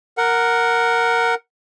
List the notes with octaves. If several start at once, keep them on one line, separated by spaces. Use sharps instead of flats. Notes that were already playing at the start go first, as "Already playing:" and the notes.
A#4 F#5